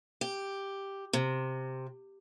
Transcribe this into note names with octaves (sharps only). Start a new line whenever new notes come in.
G4
C3